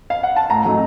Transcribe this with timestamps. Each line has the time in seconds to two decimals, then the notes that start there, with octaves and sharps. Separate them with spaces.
0.10 F5
0.23 F#5
0.36 A5
0.50 A2 A#5
0.65 F#3 A3 D#4